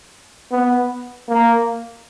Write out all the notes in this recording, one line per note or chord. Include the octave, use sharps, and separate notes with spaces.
B3
A#3